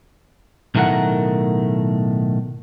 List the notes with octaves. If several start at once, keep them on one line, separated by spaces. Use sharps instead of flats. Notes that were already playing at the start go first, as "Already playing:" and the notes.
B1 A2 D#3 A3 A#4 F#5